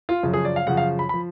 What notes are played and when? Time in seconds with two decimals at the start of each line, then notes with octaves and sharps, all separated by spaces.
0.09 F4
0.23 F#2 C#3 F3
0.34 G#4
0.45 D5
0.56 F5
0.66 F#2 C#3 F3 F#5
0.77 F5
0.99 B5
1.09 F3 B5